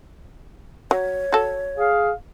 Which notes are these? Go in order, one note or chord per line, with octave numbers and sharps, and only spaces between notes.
F#3 C#5
F#4 A4
G#4 F5